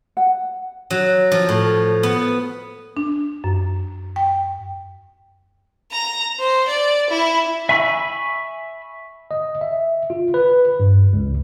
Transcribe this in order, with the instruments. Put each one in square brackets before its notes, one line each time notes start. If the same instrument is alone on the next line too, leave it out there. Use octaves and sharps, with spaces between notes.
[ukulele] F#5
[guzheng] F#3
F3
A2
B3
[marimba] D4
F#2
G5
[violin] A#5
C5
D5
E4
[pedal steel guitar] E5 G#5 B5 C#6 E6
[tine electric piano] D#5
E5
F4
B4
G2
C#2